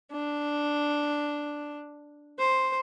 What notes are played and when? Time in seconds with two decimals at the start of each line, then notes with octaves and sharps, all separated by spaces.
0.12 D4
2.39 C5